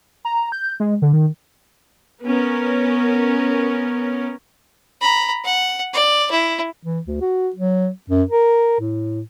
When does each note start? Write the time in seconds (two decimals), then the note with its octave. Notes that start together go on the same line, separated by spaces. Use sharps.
0.25 A#5
0.52 G6
0.80 G#3
1.02 D3
1.13 D#3
2.24 B3 C#4 A#4
5.01 A#5 B5
5.44 F#5
5.94 D5
6.31 E4
6.85 E3
7.07 D2
7.21 F#4
7.56 F#3
8.10 F#2
8.31 A#4
8.80 A2